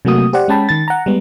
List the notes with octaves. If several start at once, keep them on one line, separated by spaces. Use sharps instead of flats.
C3 F#3 A3 A#3 F#4 D#6
G4 C5 D5 F#5
G#3 C#4 G5 A5 B5
D#3 A6
F#5 A#5
G3 G#3 B3